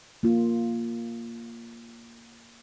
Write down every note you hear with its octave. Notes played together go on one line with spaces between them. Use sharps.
A#3 F4